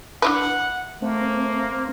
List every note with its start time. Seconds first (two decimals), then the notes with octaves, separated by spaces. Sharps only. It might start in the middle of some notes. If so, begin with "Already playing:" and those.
0.22 D4 E4 B4 F#5
1.02 A3 A#3 C4